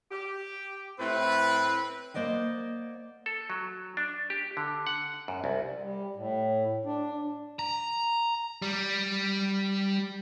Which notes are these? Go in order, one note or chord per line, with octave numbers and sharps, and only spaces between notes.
G4
A2 C4 E4 B4
A#3 C5 D5 D#5 F#5
A4
F#3
D4
G4
D3
F#5
F#2
C2
G3
A2
D4
A#5
G3